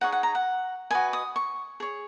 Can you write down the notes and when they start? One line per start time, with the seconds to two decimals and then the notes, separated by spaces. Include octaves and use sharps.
0.01 D#4 G#4 C#5 F#5
0.12 F#5
0.23 A#5
0.35 F#5
0.91 F#4 B4 D#5 G#5
1.13 D#6
1.36 C#6
1.80 G#4 C#5